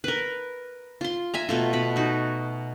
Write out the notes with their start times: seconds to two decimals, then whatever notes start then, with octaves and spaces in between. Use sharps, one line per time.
0.04 A#4 B4
1.01 F4 C6
1.34 E5 G#5 A#5
1.49 B2 A3 F4
1.73 B2 B5
1.96 D#4 F#4